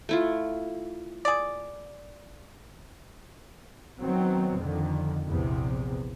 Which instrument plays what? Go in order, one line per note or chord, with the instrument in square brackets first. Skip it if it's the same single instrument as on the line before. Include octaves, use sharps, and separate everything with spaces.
[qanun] A3 E4 F4
[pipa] G#4 D5
[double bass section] D#3 F#3 B3 C4
F2 D3 D#3
A#1 E2 C3